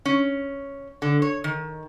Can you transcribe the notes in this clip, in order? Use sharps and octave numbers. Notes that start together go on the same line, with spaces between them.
C#4
D3
C#5
D#3